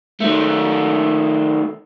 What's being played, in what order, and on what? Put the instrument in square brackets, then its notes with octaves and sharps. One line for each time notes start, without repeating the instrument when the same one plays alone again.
[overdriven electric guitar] D#3 A3